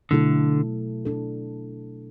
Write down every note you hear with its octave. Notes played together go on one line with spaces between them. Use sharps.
B2 D3 F#3 A3 E4 A4
B2 A3 D4 A4